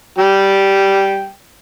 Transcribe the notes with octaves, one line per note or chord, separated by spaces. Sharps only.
G3 G5